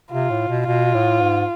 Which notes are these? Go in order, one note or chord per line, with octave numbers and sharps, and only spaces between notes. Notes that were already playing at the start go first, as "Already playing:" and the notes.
C3 F4
A2
B2
B2 F4
A2
G#2